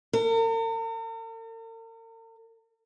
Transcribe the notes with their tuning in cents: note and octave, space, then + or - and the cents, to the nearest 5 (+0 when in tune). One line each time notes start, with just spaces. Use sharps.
A#4 -45